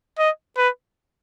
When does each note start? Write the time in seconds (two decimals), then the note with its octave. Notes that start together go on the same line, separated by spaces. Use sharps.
0.19 D#5
0.57 B4